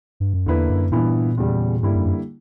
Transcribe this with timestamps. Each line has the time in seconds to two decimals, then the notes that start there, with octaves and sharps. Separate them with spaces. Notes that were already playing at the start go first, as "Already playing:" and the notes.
0.20 G2
0.34 F#2
0.46 E2 D3 A#3 E4 B4
0.70 F#2
0.92 G2 A#2 E3 B3 E4
1.37 E2 C#3 G3
1.82 G2 D3 G3 A#3 E4
1.94 F#2
2.06 F#2